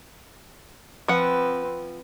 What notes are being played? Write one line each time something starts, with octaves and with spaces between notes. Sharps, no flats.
F3 C4 B4 F#5